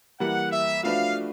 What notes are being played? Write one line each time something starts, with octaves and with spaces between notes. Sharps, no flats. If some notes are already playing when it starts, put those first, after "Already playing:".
E3 G3 A#3 F#5
E5
F3 A3 D4 F#4 B4 F5